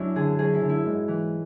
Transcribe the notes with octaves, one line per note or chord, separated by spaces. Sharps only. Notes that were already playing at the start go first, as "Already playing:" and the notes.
Already playing: F#2 D4 E4
D3 G#4
F#2 G#4
E4
D3
E4
G#2
E3